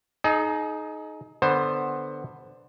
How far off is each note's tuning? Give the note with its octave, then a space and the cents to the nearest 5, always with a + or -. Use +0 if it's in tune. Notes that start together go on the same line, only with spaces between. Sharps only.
D#4 +0 G#4 +40
D3 +10 B3 +0 C5 +15